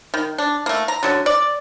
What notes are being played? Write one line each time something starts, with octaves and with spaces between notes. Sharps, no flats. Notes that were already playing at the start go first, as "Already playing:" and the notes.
D#3
D4
A3 A#3
A#5
D3 F#3 C#4
D5